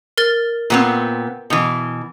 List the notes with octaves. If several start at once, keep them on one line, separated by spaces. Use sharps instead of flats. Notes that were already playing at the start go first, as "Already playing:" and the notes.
A#4 F6 A6
A#2 B3 C4
B2 E3